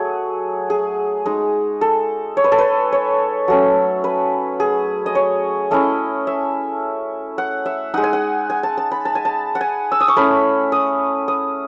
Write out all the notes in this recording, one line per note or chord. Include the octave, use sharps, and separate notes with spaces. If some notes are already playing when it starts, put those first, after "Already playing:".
Already playing: F#3 A3 F#4 G#4
G#4
G#3 D#4
A4
C#5
B4
A4
B4
C#5
F#3 A3 C#4
B4
G#4
D#5
C#5
A3 C#4 E4 D#5
E5
F#5
E5
G#3 D#4 F#5
G#5
F#5
G#5
A5
A5
B5
A5
G#5
A5
F#5
G#5
E6
D#6
C#6
A3 C#4 E4 B5
D#6
D#6